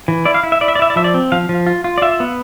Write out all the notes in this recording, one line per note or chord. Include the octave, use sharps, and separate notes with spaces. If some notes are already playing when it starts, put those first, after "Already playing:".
E3
E4 D5
F5
E4
E5
E4 D5
E5
D5
E4 E5
D5
F3 E5
D5
C4
F3 F5
F3
F4
F4
D5
F4 E5
B3